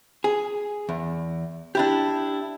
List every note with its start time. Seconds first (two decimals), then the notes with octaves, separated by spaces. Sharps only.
0.24 G#4
0.89 E2
1.75 D4 E4 G4